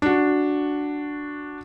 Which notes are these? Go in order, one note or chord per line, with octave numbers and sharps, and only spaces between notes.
D4 F#4